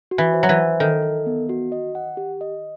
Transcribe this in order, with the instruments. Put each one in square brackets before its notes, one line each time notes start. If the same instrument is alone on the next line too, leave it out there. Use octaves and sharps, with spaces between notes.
[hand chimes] F#4
[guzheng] E3
[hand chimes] C5
[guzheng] F#3
E3
[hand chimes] C5
[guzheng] D#3 [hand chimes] A4
[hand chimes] A4
B3
F#4
D#5
F#5
G4
D#5